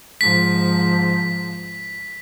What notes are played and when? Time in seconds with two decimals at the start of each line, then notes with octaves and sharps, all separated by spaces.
0.21 G#2 F3 B6